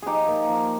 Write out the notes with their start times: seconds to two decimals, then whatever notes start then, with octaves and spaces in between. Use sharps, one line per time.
0.03 F3 D#4 G4 G#4
0.28 A#2
0.49 F3